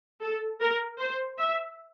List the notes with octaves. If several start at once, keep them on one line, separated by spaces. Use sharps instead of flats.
A4
A#4
C5
E5